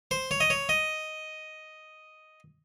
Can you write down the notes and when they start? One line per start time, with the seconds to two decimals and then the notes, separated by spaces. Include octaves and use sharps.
0.11 C5
0.31 C#5
0.40 D#5
0.50 C#5
0.69 D#5